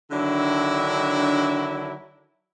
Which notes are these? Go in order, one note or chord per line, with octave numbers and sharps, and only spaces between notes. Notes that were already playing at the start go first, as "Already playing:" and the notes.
D3 D#3 F#3 D4 E4